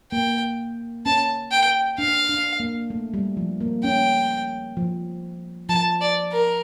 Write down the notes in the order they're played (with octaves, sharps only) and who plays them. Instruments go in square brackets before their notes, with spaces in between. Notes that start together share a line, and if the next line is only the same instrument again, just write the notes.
[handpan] A#3 [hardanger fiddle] G5
[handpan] C#4 [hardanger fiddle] A5
[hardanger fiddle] G5
[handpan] D4 [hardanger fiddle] F5
[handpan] D4
A#3
A3
G3
F3
A#3
[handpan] C#4 [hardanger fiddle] G5
[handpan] F3
[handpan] F3 [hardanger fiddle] A5
[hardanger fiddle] D5
A#4